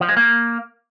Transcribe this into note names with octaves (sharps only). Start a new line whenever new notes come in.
F3
G#3
A#3